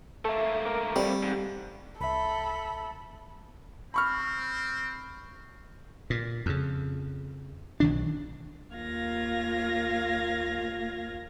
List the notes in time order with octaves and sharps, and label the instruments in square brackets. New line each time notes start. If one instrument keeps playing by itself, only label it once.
[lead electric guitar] A3 A#3 [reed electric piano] A4 E5
[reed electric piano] A#4 D6
[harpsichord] G3 [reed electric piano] C4
[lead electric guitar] G#2
[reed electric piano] C2 E5 [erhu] A4 [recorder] B5
[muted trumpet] C4 [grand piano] B5 C#6 F6
[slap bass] A#2
F2 C#3
B1 D#3 D4
[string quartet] D#2 A#3 F4 F5 G#6 A#6